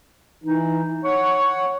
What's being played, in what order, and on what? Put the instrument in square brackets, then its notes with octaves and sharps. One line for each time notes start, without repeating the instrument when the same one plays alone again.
[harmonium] E3 [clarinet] D#4
[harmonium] C#5 F#5 [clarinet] C#6